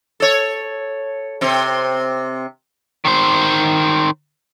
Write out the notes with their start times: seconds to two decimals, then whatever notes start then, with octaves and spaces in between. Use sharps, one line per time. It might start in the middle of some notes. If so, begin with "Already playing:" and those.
0.20 A4 C#5
1.41 C3 C4
3.05 D#3 C5